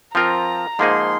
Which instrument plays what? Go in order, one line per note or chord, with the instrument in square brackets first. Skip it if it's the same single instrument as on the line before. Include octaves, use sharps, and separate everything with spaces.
[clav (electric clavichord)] F3 C4 F4 A#4 [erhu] A#5
[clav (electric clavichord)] G#2 F3 A#3 D#4 G#4 [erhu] C6